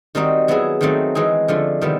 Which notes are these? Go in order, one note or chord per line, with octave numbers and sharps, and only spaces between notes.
D#3 G3 C4 D#4 F#4
F#3 B3 E4 G#4
D#3 F#3 A3 C4 D#4
E3 G#3 C4 D#4 G#4
D3 F3 A3
C3 D#3 G3 B3 E4